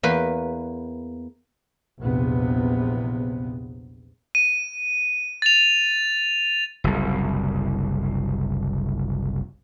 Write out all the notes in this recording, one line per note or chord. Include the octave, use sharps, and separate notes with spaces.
E2 A#3 B4
A#1 E2 C3 B3
D#7
A6 F7
F#1 C2